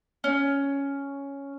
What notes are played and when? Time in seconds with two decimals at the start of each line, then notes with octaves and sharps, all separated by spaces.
0.24 C#4